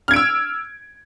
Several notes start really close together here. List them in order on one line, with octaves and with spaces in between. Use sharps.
F6 G#6 D7 E6